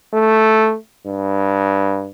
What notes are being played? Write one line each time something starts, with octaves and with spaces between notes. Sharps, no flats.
A3
G2